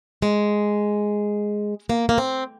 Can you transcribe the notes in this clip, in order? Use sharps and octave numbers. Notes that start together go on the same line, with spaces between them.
G#3
A#3
A#3
C4